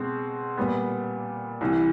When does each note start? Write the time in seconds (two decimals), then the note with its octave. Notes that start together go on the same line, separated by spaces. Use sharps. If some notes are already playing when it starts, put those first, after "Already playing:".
Already playing: B2 G#3 C4
0.57 A#2 G3 B3
1.61 C2 C3 E3